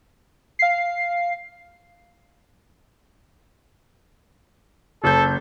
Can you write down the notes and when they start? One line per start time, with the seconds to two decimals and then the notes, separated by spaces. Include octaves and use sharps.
0.59 F5 C7
5.04 F#1 A4 G6